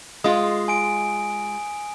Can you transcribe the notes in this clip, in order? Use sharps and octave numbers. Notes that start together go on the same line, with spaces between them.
G#3 F4 D#6
G#5 D7